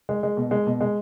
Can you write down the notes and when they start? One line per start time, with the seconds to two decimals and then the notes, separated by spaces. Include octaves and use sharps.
0.09 G#3
0.23 G#3
0.37 B2
0.51 G#3
0.66 B2
0.81 G#3